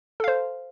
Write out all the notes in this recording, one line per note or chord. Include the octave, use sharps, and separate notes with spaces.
A4 C5 F5